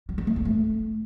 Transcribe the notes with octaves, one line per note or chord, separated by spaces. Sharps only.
G3
G#3
A3
A#3
A3